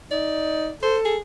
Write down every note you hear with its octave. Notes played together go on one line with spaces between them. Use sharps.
D#4 D5
A4 C5
G#4